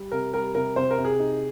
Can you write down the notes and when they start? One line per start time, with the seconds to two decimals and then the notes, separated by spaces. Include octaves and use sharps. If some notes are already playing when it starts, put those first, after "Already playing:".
Already playing: G3
0.12 C3 A#4
0.34 G3 A#4
0.55 C3 A#4
0.76 C3 C5
0.91 A#4
0.98 C3
1.05 G#4
1.19 D#4